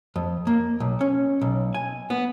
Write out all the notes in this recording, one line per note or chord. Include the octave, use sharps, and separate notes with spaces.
F2
A#3
B1
C#4
B1
G#5
B3